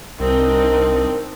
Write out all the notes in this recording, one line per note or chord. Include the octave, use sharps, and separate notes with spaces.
C2 C4 D4 D#4 A#4